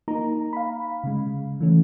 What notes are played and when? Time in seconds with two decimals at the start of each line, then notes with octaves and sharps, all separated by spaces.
0.08 A#3 D#4 A#5
0.53 F5 B5
1.04 C#3 G#3
1.60 E3 A3 C#4